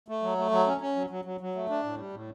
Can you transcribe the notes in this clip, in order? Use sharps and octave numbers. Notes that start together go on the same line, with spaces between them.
A3
F#3
A3
F#3
C#4
C#4
F#3
F#3
F#3
F#3
A3
D4
A2
G3
A2